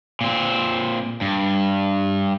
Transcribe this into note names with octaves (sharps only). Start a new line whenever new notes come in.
A#2 C4
G2